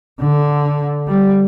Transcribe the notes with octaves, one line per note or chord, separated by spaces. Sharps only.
D3
G3